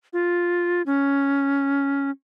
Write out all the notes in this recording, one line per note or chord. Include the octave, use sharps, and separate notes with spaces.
F4
C#4